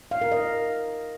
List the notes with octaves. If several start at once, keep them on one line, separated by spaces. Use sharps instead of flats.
F5
A#4
D#5